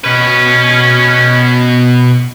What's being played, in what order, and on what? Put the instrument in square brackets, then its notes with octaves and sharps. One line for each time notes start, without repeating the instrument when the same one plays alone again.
[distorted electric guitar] B2 B4 [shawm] C#4